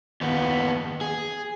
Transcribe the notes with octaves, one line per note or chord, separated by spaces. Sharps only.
D#2 B3
G#4